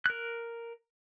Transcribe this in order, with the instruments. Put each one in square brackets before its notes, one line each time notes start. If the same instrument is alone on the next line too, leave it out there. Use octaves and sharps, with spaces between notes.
[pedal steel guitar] A#4 F#6